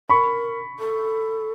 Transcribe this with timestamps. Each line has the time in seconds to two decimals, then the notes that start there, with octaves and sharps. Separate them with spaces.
0.10 A#4 B5 C#6
0.79 A4